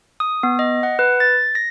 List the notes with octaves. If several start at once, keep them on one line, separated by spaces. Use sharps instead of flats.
D#6
B3
D#5
F#5
B4
A6
A#6